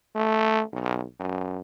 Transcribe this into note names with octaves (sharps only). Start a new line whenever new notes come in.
A3
B1
F#2